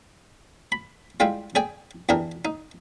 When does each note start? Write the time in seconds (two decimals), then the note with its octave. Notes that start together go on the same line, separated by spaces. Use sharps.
0.72 B5
1.20 G3 G#3 E4 F4 G5
1.55 G#4 D5 G5 G#5
2.09 E2 E3 D4 G4 A#4
2.45 D#4